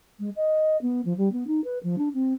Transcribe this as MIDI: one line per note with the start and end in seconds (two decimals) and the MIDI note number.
0.19 0.30 56
0.36 0.77 75
0.82 1.01 59
1.05 1.16 53
1.18 1.32 55
1.32 1.47 59
1.47 1.61 63
1.64 1.79 71
1.83 1.96 53
1.98 2.09 62
2.14 2.33 60